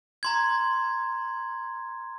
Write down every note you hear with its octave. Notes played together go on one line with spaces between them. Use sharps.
A#5 C6 G#6